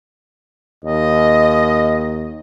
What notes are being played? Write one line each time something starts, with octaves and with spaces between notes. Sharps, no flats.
D#2 D#5